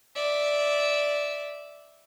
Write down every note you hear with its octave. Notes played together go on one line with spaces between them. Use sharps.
D5 E5